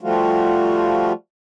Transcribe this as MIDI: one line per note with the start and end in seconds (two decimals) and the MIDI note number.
0.01 1.12 53
0.01 1.12 55
0.01 1.12 57
0.01 1.12 65
0.01 1.12 66